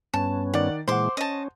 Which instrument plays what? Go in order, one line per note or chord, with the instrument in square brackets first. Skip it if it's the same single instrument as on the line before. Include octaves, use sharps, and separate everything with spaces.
[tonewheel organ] G2 B3 C#4 [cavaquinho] A5
[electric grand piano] D#3 D5 [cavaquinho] F#5
[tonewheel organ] A#2 E3 G#3 [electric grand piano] C5 F#5 [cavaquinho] C6 D6
[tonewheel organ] C#4 [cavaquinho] D#5 A5